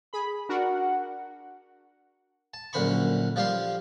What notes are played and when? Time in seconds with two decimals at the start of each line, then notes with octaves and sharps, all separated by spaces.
0.13 G#4 B5
0.49 D4 F#4 A#4 F#5
2.54 A5
2.73 A#1 F#2 D3 C5 B5 C#6
3.36 F3 G3 G4 F5 C6